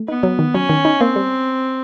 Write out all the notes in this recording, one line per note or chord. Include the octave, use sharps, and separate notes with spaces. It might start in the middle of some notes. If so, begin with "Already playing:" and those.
Already playing: A3
B3 D#4
F#3
D#3
F#3 C#4
D#3
D#4
A#3 C4
G3